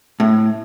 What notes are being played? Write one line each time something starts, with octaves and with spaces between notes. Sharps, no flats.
A2